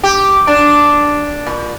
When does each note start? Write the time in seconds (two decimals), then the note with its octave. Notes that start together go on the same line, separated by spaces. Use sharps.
0.04 G4
0.47 D4
1.47 A#2